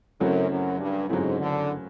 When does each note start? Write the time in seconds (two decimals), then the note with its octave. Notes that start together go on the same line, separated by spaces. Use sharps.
0.20 F#2 C#3 F#3 A3 C4 E4
0.50 F#2
0.79 G2
1.09 G#2 C#3 F#3 A3 C4 E4
1.39 D3